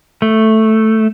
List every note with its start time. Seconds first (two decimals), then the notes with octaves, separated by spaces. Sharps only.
0.22 A3